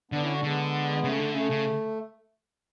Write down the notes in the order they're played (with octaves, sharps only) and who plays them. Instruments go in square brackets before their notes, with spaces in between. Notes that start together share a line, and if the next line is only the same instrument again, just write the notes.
[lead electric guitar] D3 [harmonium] B3 D4
[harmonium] C#4 E4
D4 F#4
[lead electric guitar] D3 [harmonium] G#3 B3
[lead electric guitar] C#3 [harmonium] A3
[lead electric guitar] D3
[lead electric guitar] C#3 [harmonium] A3
[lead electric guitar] C#3